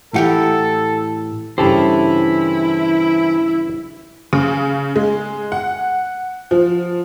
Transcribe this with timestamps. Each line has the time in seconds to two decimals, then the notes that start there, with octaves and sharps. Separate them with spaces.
0.14 A2 E3 G4 A4 A#4 F#5
1.58 G2 C#3 E3 E4 G4 A4 C5
4.33 C#3
4.96 G#3
5.52 F#5
6.51 F3